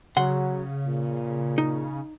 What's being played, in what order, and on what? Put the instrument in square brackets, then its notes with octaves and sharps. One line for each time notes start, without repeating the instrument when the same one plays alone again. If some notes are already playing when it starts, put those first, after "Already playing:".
[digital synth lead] C#3 [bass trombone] F#3 [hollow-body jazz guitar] F#5 C6
[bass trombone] A#2
[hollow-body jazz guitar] D#4